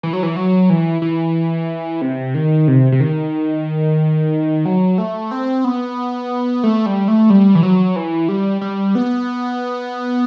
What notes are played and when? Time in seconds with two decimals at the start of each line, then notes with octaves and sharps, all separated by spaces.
0.03 E3
0.13 F#3
0.23 E3
0.36 F#3
0.70 E3
1.02 E3
2.02 C3
2.34 D#3
2.68 C3
2.92 C3
3.00 D#3
4.65 F#3
4.98 A3
5.31 C4
5.64 B3
6.64 A3
6.86 G3
7.08 A3
7.30 G3
7.55 E3
7.63 F#3
7.96 E3
8.29 G3
8.61 G3
8.95 B3